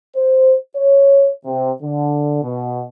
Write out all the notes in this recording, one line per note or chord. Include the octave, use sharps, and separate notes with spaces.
C5
C#5
C3
D3
B2